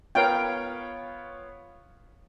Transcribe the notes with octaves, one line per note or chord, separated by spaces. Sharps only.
B3 F4 A#4 C#5 F5 G5